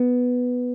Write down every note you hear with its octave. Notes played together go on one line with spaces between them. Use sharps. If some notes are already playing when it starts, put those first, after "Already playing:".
Already playing: B3